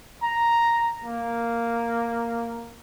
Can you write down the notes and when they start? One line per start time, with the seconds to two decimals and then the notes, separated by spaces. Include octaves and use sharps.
0.23 A#5
1.04 A#3